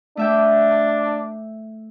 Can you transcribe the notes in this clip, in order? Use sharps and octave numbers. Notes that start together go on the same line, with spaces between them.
A3 D4 E5 G5